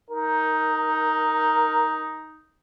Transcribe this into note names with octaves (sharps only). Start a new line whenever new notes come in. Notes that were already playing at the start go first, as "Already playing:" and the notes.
D#4 A#4